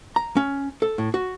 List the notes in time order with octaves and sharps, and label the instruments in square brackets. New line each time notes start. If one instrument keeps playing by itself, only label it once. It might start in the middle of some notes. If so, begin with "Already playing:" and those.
[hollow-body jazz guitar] A#5
C#4
A4
A2
F#4